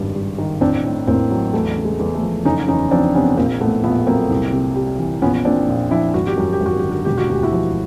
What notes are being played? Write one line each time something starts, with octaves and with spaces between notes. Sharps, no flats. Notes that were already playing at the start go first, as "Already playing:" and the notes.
Already playing: G#1 G2 C#3
G3
D#3
A1 C4 D4
A2
A1 A#3 C4
F#3
E2 A3
C#3
G#3
E2
A3
F3
F#1 C#4 D#4
E2 C#4 D#4
F3 C4 D4
C3 B3 C#4
A#1 A#3 C4
A2 A3 B3
A#1 A3 B3
F#3 A#3 C4
C2
C3
G3
E3
A#1 B3 C#4
A#2 C4 D4
A#1
F3 D4 E4
G#1 F#4
G4
F#2 F#4
G4
G#1
F#4
D3 G4
F#4
E1 G4
F#4
D2 G4
E4 F#4
F3